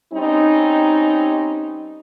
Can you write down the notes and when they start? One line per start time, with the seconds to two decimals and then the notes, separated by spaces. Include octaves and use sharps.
0.13 G3 C4 C#4 D#4